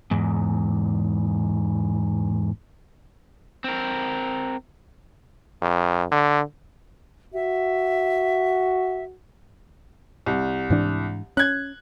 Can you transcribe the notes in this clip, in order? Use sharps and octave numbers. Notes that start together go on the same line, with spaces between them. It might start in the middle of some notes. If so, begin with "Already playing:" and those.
E2 G#2
C4 A#4
F2
D3
F#4 E5
C2
G#2 E3 D4
C#4 F#6 G#6